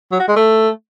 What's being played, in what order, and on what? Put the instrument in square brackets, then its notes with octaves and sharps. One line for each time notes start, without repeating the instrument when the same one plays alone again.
[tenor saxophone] F#3
F#4
G#3
A3